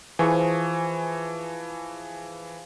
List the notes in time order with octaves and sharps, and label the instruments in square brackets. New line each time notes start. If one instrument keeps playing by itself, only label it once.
[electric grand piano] E3 [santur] F3 G#4 C#6